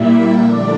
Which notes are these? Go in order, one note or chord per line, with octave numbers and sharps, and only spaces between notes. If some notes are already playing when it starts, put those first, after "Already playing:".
Already playing: A#2 G3 A#3 E4 E5
D3 F3 A3 D4 D5